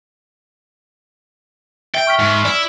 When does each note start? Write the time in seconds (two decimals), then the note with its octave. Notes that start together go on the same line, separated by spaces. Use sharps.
1.95 E5 G5
2.07 C#6 F6 B6
2.19 G#2
2.45 E4 D5